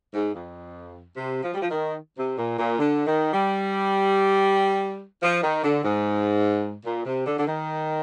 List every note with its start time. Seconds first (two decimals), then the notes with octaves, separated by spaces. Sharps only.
0.14 G#2
0.34 F2
1.16 C3
1.43 F3
1.54 G3
1.62 F3
1.71 D#3
2.18 C3
2.38 A#2
2.59 A#2
2.79 D3
3.06 D#3
3.33 G3
5.23 F3
5.43 D#3
5.63 D3
5.84 G#2
6.85 A#2
7.06 C3
7.26 D3
7.39 D3
7.47 D#3